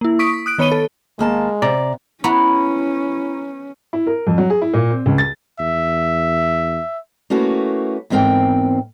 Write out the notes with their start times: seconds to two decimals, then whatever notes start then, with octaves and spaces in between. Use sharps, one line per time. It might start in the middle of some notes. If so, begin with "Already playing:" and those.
0.01 A#3 E4
0.19 C#6 D#6 B6 D7
0.33 B6
0.46 D#6 F#6 D7
0.58 D#3 B3 C#5 B5 D#7 G7
0.72 A4
1.19 D#2 G#3 A#3 A5
1.62 C3 D5 A#5
2.24 B3 C#4 E4 A#5 C#6
3.93 E4
4.07 A#4
4.27 F2
4.38 F#3
4.50 G#4
4.62 E4
4.74 A#2
4.90 C4
5.06 C#2
5.18 A6
5.59 E2 E5
7.30 A3 A#3 C#4 E4 F#4 B4
8.10 E2 G#2 C4 A#4 G5